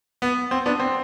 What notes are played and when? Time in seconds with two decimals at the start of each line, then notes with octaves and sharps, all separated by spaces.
0.22 B3
0.51 C4
0.66 B3 D4
0.80 C4